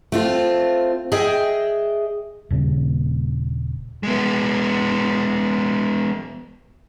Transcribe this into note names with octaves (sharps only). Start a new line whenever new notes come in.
A3 C4 F4
G#4 D#5 E5 G5
D#1 C#3
G#3 B3